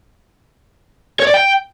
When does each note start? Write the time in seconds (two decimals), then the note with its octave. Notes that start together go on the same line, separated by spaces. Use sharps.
1.20 C#5
1.27 D5
1.34 G5